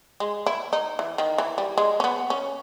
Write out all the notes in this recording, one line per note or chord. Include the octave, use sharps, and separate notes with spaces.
G#3
E4
D#4
E3
D#3
E3
G3
G#3
C#4
B3
C#4